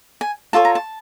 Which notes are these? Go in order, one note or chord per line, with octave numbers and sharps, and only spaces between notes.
G#5
F4 A4 C#5 A5
A#5
A5